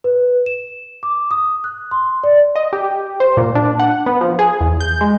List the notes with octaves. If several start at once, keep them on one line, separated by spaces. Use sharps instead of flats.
B4
E7
D6
D#6
F#6
C6
D5
D#5
G4
C5
A#2
D4
F#5
B3
F3
G#4
E2
G6
G#3